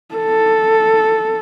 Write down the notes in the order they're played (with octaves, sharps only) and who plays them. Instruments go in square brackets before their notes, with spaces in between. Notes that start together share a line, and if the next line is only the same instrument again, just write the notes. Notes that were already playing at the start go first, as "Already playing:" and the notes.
[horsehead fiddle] A4